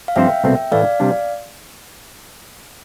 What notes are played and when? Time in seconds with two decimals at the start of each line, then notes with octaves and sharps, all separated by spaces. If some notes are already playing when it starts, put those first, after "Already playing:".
0.08 F5
0.16 G2 F3 C4 G4 C5 E5 G5
0.44 C2 B2 A3 C4
0.72 A2 E3 A3 D5 F5
1.00 C3 G3 D4